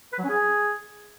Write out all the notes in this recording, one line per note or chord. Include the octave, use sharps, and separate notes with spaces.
B4
F#3
C#4
G#4